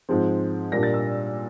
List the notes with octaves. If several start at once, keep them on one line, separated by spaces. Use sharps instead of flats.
G#2 F3 G#3 C4
A#2 G3 A#3 D4 A#6
A6
E6